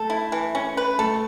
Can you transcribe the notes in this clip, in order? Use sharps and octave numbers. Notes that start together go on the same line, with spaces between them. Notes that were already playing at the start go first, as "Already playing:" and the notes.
Already playing: A3 A4
E4
E3
C#4
B4
A3 A4